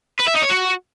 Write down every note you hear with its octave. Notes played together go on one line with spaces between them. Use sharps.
B4
E5
D#4
C#5
F#4